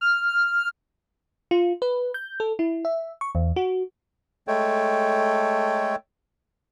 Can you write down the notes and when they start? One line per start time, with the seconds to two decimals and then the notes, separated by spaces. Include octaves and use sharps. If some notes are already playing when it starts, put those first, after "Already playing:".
0.01 F6
1.51 F4
1.82 B4
2.14 G6
2.40 A4
2.59 E4
2.85 E5
3.21 C#6
3.35 E2
3.56 F#4
4.48 G#3 A3 A4 C#5 G5